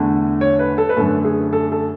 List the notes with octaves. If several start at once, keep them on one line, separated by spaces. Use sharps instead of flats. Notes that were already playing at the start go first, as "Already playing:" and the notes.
Already playing: E2 D3 A3
C#5
B4
A4
B4
F#2 D3 A3 A4
G#4
A4
A4